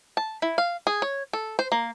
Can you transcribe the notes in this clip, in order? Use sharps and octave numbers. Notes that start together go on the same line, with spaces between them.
A5
E4
F5
G#4
C#5
A4
C5
A#3